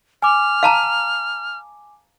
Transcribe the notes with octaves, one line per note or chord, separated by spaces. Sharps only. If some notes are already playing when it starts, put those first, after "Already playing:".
G#5 D6 F6
F5 A5 A#5